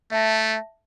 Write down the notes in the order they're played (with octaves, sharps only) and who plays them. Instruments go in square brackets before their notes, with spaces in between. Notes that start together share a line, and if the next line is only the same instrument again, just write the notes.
[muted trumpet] A3 [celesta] E5 A5 A#6